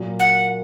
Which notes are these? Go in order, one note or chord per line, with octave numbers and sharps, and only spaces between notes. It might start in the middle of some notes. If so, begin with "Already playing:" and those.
Already playing: A#2 F#3 A#3
F#5